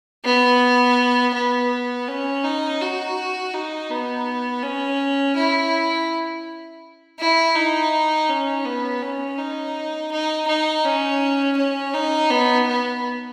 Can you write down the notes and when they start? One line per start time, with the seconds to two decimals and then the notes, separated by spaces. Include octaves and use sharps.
0.24 B3
1.34 B3
2.07 C#4
2.44 D#4
2.81 F#4
3.53 D#4
3.90 B3
4.62 C#4
5.36 E4
7.19 E4
7.55 D#4
8.29 C#4
8.65 B3
9.01 C#4
9.38 D#4
10.11 D#4
10.47 D#4
10.84 C#4
11.57 C#4
11.93 D#4
12.30 B3
12.67 B3